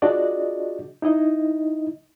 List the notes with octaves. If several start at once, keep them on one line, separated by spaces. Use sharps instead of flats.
D4 F4 F#4 G#4 D5 D#5
D#4 E4 D#5